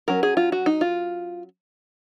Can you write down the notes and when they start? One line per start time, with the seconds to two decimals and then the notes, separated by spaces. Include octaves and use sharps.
0.08 F#3 C#4 A#4
0.23 G#4
0.37 F4
0.52 F#4
0.66 D#4
0.81 F4